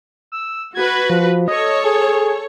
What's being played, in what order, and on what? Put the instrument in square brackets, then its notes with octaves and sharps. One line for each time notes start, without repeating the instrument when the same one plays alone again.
[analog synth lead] E6
[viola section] F#4 B4 [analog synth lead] G#6
[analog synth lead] F3
[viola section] A4 C#5 [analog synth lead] D#5
[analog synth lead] G#4